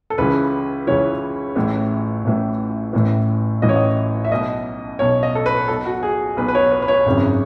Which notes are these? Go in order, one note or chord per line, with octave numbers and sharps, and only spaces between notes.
A4
C#2 C#3 E3 B4
C#2 C#3 E3 C#5
A1 A2 E3
A1 A2 E3
A1 A2 E3
A1 A2 E3 D#5
C#5
D#5
E5
B1 B2 D#5
B1 B2 C#5
D#5
A4
B4
B1 B2 A4
F#4
G#4
B1 B2 B4
B4
C#5
B4
B4
C#5
G#1 F#2 C#3 E3